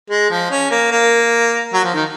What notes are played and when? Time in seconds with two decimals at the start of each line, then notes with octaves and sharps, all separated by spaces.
0.10 G#3
0.30 F3
0.50 C#4
0.71 A#3
0.91 A#3
1.73 F#3
1.84 F3
1.94 D#3